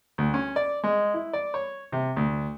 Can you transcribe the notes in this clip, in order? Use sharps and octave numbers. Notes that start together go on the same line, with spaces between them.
D2
C#4
D5
G#3
E4
D5
C#5
C3
D2